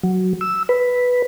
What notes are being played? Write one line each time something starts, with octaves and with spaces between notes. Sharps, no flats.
F#3
E6
B4